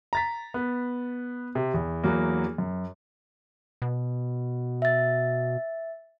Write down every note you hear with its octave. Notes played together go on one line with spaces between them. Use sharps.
A#5 A6 B6
B3
C3
E2
E2 F#3 A#3
F#2
B2
E5 A6